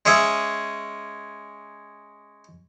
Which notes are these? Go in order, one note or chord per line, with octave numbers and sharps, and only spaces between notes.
G#3 C#4 G#4 E5